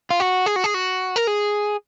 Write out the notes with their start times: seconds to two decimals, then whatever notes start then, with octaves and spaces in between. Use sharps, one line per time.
0.10 F4
0.20 F#4
0.46 G#4
0.56 F#4
0.64 G#4
0.74 F#4
1.16 A#4
1.27 G#4